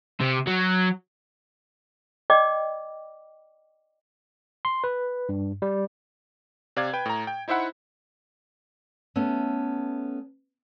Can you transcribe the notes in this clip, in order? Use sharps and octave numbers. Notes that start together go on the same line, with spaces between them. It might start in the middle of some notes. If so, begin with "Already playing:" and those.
C3
F#3
D5 D#5 G5 D6
C6
B4
G2
G3
C3 D5 F5 G#6
B4 G5
A2 A#5
G5
D#4 E4 C5 E5 F#5 B5
A3 B3 C#4